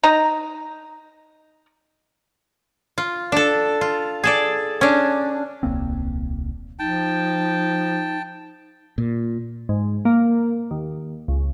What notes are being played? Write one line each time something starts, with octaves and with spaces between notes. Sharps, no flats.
D#4 A#5
F4
D4 A4
F4
G#4 A4 D5
C#4 D4
D#1 C2 A#3 C4
F3 D#4 G5 A5
A#2
G#2
A#3
D#2
C#2